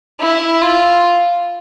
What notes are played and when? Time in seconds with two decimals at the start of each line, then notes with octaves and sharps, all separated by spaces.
0.20 E4
0.61 F4